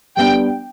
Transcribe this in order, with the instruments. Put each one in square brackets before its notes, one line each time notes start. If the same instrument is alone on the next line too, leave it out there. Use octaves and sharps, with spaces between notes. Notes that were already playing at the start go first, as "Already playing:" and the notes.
[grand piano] G3 B3 D4 [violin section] G5